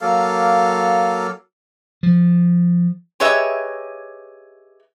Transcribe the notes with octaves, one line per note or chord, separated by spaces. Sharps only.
F#3 A#3 A4 F5
F3
G4 G#4 B4 C#5 D#5 E5